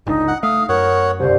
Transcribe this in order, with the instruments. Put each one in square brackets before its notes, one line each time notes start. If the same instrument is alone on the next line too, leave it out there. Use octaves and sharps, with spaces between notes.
[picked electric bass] G1 C#2 D3 [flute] D#4
[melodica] F#5
[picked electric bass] A3 [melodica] F5 [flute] D#6
[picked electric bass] F#2 [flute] A#4 [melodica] C#5 F#5
[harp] G1 C2 [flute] C5